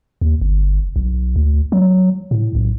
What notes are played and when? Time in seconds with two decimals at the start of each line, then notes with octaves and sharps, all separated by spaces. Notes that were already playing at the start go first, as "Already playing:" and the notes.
0.21 D#2
0.41 G1
0.96 B1
1.36 D2
1.72 F#3
2.31 A2
2.55 B1